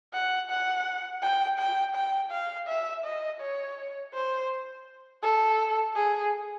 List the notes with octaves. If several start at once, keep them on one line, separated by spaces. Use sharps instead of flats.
F#5
F#5
G5
G5
G5
F5
E5
D#5
C#5
C5
A4
G#4